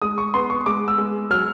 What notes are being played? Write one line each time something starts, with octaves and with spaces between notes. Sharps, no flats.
G#3 D#6
C#6
B3 C6
C#6
G#3 D6
E6
G#3
F#3 F6